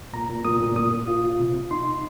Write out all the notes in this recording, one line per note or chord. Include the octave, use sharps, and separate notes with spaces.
A#2 A#5
A#2
A#2 D#6
A#2
A#2 D#6
A#2
F4
F4
C3
C3
D#4 C6
D#4